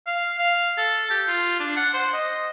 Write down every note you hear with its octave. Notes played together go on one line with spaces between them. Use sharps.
F5
F5
A4
G4
F4
D4
F#5
C5
D#5